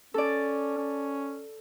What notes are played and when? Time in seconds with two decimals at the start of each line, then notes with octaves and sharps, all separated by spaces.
0.14 C#4 A4 D5
0.77 C#4